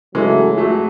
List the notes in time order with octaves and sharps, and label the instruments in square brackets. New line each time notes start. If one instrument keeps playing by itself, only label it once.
[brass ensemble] C#3 F#3 A3 [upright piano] E3 G#3
[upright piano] F#3 A3